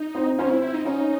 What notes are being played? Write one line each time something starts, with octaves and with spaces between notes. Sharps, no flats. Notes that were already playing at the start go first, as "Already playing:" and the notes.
Already playing: D#4
C4 C5
C4 C#4 C5
E4
E4
D#4
C#4 D#4 C#5